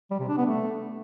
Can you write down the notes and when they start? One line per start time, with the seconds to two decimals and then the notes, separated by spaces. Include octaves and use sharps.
0.11 G3
0.20 C3
0.28 D4
0.37 B3
0.46 A3